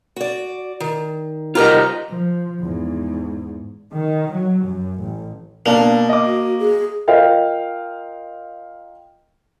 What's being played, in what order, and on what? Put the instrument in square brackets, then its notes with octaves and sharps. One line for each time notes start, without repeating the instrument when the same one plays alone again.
[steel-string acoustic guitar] F#4 D5
D#3
[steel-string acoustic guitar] C3 G4 A#5 [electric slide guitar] F4 A#4 D#5
[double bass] F3
E2 G#2
[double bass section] D#3
F#3
F#2
A1
[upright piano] B2 D4 A5 [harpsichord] A#3
[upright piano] D#5 D6
[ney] F#4
G#4
[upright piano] F4 A#4 D#5 F5 G5